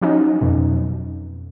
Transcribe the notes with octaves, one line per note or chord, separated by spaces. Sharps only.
F3 F#3 C#4 D#4
F2 B2